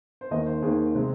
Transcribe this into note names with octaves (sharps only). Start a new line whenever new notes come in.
C5
D#2 D#3 A#3 D#5
C5
D#2 D#3 A#3 G#4
C3 G#3 C4